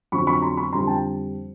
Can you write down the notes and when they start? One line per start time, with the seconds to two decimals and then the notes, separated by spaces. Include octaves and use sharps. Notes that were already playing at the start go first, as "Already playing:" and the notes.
0.12 F2 D3 F#3 B5 C#6
0.27 B5 C#6
0.42 A#5 C6
0.57 B5 C#6
0.73 F2 D3 G3 A#5 C6
0.87 G5 A5